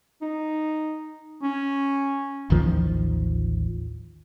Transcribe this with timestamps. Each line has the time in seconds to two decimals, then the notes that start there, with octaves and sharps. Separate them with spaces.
0.22 D#4
1.43 C#4
2.50 A1 D#2 D#3 F3